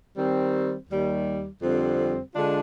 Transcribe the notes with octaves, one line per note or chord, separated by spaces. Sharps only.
D#3 G3 C4
D#2 D#3 G3
F2 D3 G3 C4
D3 G#3 D4 F4